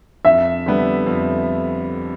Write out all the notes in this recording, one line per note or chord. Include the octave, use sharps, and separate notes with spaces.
F2 E5
D3 G3 B3
F2